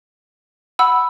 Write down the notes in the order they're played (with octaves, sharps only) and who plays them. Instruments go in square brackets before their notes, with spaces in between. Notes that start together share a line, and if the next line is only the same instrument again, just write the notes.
[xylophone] F#5 B5 E6